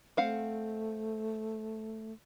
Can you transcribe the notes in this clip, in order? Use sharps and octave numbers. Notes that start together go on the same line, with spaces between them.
A3 C4 F5 F#5